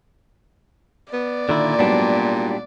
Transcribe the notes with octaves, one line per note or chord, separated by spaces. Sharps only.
B3 D5
A#2 D3 D#3 E4
G#2 F#3 G3 B3 D4